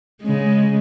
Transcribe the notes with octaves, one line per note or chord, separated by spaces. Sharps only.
C#3 G#3